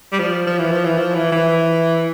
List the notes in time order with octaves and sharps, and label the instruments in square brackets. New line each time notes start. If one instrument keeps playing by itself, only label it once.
[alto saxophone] G3
F3
F3
E3
F3
E3
F3
E3
E3